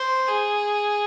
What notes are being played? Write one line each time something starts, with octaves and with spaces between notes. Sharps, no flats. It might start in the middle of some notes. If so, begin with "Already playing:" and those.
Already playing: C5
G#4